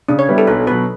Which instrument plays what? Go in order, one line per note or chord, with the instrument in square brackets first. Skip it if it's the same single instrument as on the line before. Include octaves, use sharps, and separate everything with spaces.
[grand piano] C#3 [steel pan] D4
[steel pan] C#5
[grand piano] G3 B3 E4
[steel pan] A4
[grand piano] B1 [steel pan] B4
[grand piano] B2 F#3 [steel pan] B4